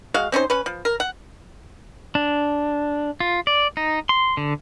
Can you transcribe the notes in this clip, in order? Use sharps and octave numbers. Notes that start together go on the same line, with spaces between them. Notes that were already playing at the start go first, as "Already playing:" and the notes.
G#3 F#4 F5
C4 C#4 D#4 C5
C#4 B4
F3
A#4
F#5
D4
F4
D5
D#4
C6
D3